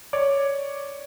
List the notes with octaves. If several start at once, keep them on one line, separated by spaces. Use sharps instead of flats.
C#5 D5 D6